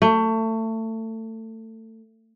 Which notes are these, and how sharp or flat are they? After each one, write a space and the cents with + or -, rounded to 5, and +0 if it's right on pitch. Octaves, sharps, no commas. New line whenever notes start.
A3 +25